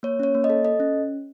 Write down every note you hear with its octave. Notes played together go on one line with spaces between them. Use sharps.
A#3 C#5
C#4 C#5
A#3
D#5
A4
A4 D#5
C#4